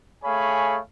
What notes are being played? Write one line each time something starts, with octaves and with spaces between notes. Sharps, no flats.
A3 G#4 C#5 F5 G#5 B5